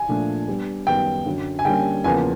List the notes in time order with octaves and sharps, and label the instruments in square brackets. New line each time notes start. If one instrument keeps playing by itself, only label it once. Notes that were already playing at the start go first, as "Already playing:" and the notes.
Already playing: [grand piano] G#5
[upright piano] A#2 F3 A3 D4
G3 B3 D4
[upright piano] F#2 D#3 G3 B3 [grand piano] G5
[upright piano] F#2 D3 F#3
[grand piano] G#5
[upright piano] D3 G3 A#3 C#4 [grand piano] G5
[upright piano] E2 C#3 F3 A#3 [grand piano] G#5